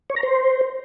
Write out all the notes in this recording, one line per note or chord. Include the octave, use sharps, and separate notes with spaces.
C#5
A#5
C5